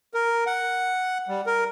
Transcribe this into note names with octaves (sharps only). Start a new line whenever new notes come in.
A#4
F#5
G3
A#4